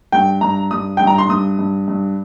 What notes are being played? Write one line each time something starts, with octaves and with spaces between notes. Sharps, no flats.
G2 G5
G2 A#5
G2 D#6
G2 G5
A#5
C6
G2 D#6
G2
G2